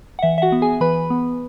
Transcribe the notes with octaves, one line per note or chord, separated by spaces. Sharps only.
F#5
E3 E5
E5
F#4 F#5
B3
G#4 G#5
E3 B4 B5
B3